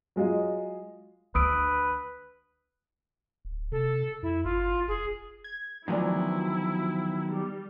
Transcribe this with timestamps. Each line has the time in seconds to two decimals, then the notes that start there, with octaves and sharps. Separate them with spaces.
0.16 F#3 G#3 F4 D#5
1.35 D2 D4 B4 D#6 E6 D7
3.45 D1
3.72 C3 A4
4.23 F2 E4
4.44 G1 F4
4.88 F1 G#4
5.44 G#6
5.88 D2 D#3 F3 F#3 G#3 B3 E4 D5
7.32 G3